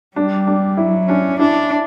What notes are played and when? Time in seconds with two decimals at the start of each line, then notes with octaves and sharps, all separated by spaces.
0.16 G3 D4
0.47 D4
0.77 F#3 E4
1.08 C#4 D4
1.39 D4 E4